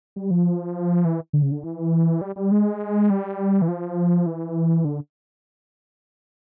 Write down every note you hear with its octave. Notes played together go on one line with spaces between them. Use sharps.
G3
F3
E3
D3
C#3
D3
E3
G3
G3
G#3
G3
E3
F3
E3
D3